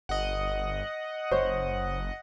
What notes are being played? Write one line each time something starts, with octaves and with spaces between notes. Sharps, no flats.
G1 D#5 F#5
F#1 C5 C#5